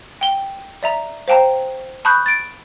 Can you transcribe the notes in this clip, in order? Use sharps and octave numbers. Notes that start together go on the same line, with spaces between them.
G5 G7
D5 E5 A#5
C5 F5 G5 A5 A#5
A5 B5 C#6 D#6 F#6 G6
A6 D7